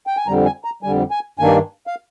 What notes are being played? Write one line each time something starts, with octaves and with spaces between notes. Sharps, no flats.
G5
G#5
F2 D3 G3 A#5
G#5
A#5
F2 D3 G3 G#5
G#5
G2 D#3 A#3 D4 G#5
F5